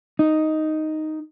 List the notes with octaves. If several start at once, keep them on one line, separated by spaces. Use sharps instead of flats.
D#4